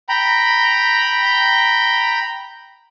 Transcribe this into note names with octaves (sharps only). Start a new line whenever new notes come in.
G5 A#5 B5